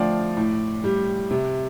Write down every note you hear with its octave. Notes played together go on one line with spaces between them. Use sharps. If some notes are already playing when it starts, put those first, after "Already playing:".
Already playing: D3 F3 A3 D5 F5 G5
A2
G3
C3